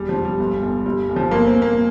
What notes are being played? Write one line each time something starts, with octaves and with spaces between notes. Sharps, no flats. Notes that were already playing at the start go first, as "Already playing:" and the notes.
Already playing: E1 G3
F3
E1
G3
G1
G1
G1 G3
G1
F3
G1 A#3
C4
G1
A#3